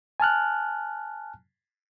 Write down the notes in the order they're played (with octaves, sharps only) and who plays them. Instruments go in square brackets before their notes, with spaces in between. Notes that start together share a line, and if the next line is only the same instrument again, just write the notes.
[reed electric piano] G#5 A5 F6 F#6